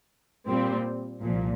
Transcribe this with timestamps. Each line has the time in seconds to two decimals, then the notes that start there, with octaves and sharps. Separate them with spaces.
0.46 A#2 G3 C4
1.21 C2 A#2 F3